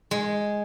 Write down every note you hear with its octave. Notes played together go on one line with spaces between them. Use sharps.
G#3